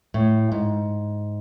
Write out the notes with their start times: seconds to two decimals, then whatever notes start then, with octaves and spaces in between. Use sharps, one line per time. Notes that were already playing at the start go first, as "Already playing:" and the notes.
0.14 A2
0.52 G#2